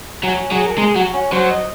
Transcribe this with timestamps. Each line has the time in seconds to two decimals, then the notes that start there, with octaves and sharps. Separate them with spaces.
0.23 F#3 C#4
0.52 F#3 G#4
0.66 A#4
0.78 G#3 G#4
0.96 F#3 F#4
1.13 C#4
1.32 F#3 C5
1.50 D#5